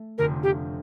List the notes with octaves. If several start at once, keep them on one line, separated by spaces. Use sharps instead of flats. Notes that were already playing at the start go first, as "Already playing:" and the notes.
Already playing: A3
F1 F2 D3 A#4
G4